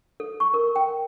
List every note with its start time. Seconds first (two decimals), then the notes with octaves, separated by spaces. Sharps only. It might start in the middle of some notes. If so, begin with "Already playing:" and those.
0.20 A4
0.40 C#6
0.54 A#4
0.76 G5